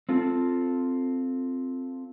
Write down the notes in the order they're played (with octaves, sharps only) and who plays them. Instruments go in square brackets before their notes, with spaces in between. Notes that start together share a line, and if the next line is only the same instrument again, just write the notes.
[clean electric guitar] C4 F4 A4